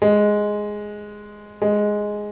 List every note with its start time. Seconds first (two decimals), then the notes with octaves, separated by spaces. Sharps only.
0.02 G#3
1.62 G#3